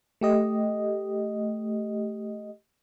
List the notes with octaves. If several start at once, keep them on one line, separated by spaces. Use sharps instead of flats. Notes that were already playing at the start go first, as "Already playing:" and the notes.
A3 G4 D#5